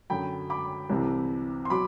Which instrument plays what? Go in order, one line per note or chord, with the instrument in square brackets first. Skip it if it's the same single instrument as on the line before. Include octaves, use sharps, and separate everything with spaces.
[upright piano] F#2 D3 F#3 G5 B5
B5 D6
C2 C3 E3
C6
B2 F#3 B5 D6